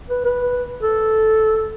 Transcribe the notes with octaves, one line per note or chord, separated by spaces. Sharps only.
B4
B4
A4